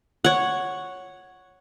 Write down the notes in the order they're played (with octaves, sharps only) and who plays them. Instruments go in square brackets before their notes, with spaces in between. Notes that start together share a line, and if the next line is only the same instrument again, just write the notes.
[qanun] C#5 F#5